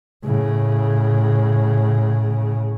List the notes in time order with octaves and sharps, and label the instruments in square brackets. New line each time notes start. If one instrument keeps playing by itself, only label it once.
[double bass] A2 C#3